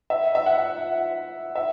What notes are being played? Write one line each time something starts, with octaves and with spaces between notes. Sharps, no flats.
E5
E5
F#5
E5